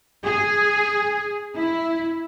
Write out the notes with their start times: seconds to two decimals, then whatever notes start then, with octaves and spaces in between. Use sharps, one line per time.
0.24 G#4
1.55 E4